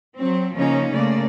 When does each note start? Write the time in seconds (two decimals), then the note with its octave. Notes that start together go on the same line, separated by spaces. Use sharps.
0.18 F#3 C4
0.55 C#3 F3 A#3 C#4 D#4
0.93 C#3 A3 A#3 D5